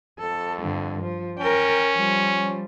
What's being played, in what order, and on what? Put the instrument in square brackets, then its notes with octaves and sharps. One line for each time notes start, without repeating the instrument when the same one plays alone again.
[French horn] F2 [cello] A4
[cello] G2 D3
F3
[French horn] C#4 [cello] A#4 G5
[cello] F3 G3